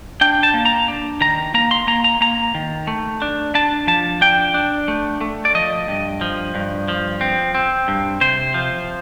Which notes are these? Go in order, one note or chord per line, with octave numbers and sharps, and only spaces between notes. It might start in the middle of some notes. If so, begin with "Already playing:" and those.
D4 G5
A5
A#3
A#5
D4
D#3 A#5
A#3 A#5
C6
A#3 A#5
A#5
A#3 A#5
D#3
A3
D4
D4 A5
F3 A5
D4 G5
D4
A3
A3
D5
F3 D#5
G2
F3
G2
F3
C4
C4
G2
C3 C5
F3